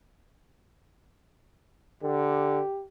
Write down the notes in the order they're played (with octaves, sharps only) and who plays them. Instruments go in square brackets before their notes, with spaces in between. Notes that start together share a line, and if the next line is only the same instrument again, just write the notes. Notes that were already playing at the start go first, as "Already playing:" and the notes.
[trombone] D3 [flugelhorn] G4